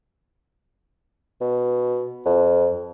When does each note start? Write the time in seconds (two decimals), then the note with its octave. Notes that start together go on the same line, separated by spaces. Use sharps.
1.41 B2
2.25 F2